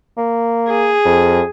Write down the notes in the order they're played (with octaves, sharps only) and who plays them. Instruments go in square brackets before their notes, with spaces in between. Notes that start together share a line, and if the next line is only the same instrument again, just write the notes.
[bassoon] A#3
[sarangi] G#4
[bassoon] F2